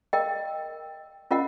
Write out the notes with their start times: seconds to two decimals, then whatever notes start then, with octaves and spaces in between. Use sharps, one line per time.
0.13 A#4 D#5 G5
1.31 C#4 F4 A#4 D#5 F#5